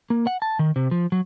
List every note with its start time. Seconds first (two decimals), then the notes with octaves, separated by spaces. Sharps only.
0.10 A#3
0.27 F#5
0.42 A5
0.59 D#3
0.76 C3
0.91 F3
1.12 F#3